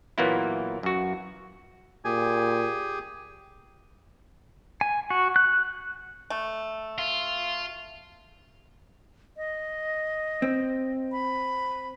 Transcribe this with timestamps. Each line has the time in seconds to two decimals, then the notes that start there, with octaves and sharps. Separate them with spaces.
0.18 A#2 E3 F#3 A#3 B3 E4
0.83 F#2 F#4
2.05 A#2 G4 G#4 G#5
4.81 G#5
5.10 F#4
5.36 F#6
6.30 A3
6.98 F4
9.37 D#5
10.42 C4
11.12 B5